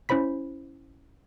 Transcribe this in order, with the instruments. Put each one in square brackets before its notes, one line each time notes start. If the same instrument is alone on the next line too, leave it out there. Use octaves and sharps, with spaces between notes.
[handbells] C#4 E4 C5 B5 B6